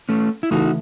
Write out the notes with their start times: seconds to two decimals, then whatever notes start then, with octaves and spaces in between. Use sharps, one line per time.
0.09 A3 C#4
0.43 E4
0.51 C#3 E3 A3 D#4 F#4